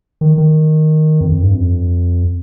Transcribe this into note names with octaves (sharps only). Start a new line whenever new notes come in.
D#3
D#3
F2
F2
G2
F2